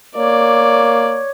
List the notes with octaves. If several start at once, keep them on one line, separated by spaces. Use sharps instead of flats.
A#3 C#5 D5